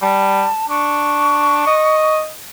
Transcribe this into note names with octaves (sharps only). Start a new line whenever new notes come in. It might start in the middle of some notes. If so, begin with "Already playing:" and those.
G3 A5
D4 C#6
D#5